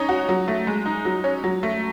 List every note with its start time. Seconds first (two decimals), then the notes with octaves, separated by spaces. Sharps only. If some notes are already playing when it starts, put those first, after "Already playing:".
Already playing: C#4 D#4
0.09 F#4
0.29 F#3
0.48 A3
0.67 G#3
0.86 D#4
1.05 F#3
1.24 C#4
1.44 F#3
1.63 A3